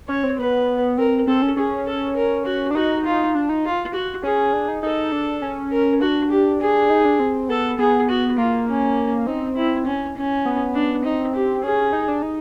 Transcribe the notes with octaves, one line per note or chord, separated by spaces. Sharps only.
C#4 C#5
C4
B3 B4
C4 A#4
C4 A4
C#4
C#4 G#4
A4
A#4
F#4
D4
D#4 F#4
F4
D4
D#4
F4
F#4
C#4 G#4
D4
D#4
D#4 A4
D4
C#4
A#4
D4 F#4
G4
G#4
D#4
D4
C4
B3 A4
B3 G#4
F#4
A#3 F4
C#4
C4 D#4
E4
C#4
C#4
B3
D4
C4 D#4
G4
C#4 G#4
D#4
D4
D#4